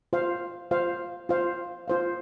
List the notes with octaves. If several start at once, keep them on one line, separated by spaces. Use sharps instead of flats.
F4 C5 F5
F4 C5 F5
F4 C5 F5
F4 C5 F5